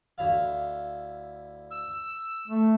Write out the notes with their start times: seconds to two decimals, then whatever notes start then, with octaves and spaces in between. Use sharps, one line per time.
0.18 D2 E4 F5
1.71 E6
2.48 A3